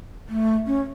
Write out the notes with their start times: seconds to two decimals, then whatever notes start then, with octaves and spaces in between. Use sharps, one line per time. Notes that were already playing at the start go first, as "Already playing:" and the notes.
0.29 A3
0.66 C#4